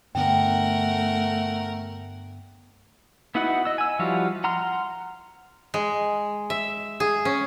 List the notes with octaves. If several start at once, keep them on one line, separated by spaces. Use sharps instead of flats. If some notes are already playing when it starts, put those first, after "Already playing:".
G2 D3 A3 B3 A#4 F#5 G5
B3 D#4 E4 F#4 F#5
D#5 E6
G#5 E6
F3 G3 E4 F#4 F5
F#5 A#5 C6 F6
G#3
E5
G#4
C#4